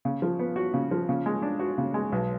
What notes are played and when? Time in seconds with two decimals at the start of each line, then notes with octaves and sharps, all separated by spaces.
0.05 C#3
0.22 F3
0.39 B3
0.56 F#4
0.74 C#3
0.91 F3
1.09 C#3
1.26 G#3
1.42 D4
1.59 F#4
1.78 C#3
1.94 G#3
2.12 B1